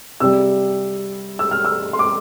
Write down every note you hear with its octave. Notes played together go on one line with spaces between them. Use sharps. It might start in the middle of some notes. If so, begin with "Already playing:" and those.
C3 G3 E6
E6
F6
E6
C6
D6